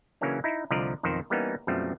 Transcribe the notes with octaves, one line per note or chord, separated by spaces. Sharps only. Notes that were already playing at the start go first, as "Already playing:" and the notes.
C#3 E3 F#3 A#3 C#4 D4
D#4 E4
C2 D3 F3 D5 D#5 A#5
B1 F2 D#3 D#4 C5
E3 G3 A#3 B3 C#4 D#4
F#2 B2 F3 G3 A3 C4